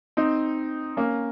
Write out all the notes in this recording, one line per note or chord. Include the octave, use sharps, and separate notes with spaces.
C4 D#4
A#3 C#4